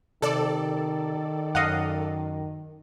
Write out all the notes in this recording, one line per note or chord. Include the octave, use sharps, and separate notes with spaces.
C3 D#3 A4 D5
F#2 D#5 F5 F#5